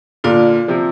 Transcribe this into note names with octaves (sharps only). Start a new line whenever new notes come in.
A#2 D3 F4 D5 F5
C3 F3